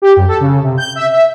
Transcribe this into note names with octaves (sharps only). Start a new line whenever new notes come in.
G4
F#2
A4
C#3
C3
G6
E5
E5